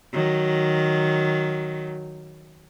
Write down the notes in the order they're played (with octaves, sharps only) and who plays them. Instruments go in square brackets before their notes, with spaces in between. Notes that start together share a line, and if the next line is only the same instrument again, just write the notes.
[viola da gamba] D#3 F#3